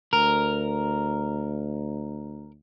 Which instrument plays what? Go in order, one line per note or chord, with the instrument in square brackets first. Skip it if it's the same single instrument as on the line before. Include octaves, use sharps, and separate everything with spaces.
[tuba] D2 [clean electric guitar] A#4